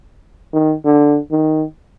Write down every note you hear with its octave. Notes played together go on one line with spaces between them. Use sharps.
D#3
D3
D#3